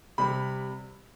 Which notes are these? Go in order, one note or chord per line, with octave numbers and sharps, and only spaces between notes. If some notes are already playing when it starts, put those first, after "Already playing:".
C3 G3 B5